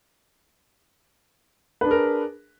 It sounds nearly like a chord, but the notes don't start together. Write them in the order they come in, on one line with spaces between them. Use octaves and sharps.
B4 D4 G#4 A#4